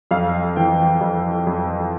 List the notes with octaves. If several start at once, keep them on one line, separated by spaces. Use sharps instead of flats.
F2 F5
E3 G5
F2
F2